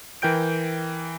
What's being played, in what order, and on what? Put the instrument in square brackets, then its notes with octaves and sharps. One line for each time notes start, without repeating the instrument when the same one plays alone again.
[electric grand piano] E3 A#4 G5 G6 D7